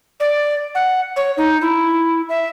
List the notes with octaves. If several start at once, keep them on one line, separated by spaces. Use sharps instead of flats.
D5
F#5
C#5
D#4
E4
E5